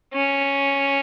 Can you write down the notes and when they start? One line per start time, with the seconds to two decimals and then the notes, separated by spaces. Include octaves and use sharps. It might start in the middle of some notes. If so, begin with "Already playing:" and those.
0.14 C#4